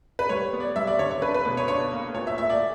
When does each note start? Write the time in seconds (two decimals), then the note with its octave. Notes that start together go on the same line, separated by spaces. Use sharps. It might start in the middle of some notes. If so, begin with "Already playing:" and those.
0.19 B4
0.29 G3 C#5
0.53 B3
0.60 D5
0.76 G3 E5
0.87 D5
0.99 D3 C#5
1.11 C#5
1.22 D4 B4
1.34 B4
1.45 B2 B4
1.57 C#5
1.68 D4 C#5
1.92 A#3
2.14 A#2 C#5
2.27 E5
2.38 A#2 E5
2.50 D5